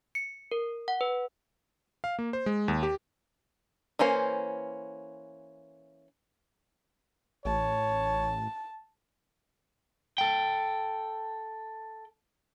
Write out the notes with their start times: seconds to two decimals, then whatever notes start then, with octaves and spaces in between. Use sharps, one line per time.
0.15 C#7
0.52 A#4
0.88 F#5
1.01 B4
2.04 F5
2.19 A#3
2.33 C5
2.46 G#3
2.68 D#2
2.83 G4
3.99 E3 A#3 C#4 C5
7.45 A1 C#5 A5
10.18 A4 G5